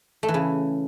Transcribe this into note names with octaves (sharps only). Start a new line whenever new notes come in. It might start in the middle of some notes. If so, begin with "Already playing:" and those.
A3
E3
C#3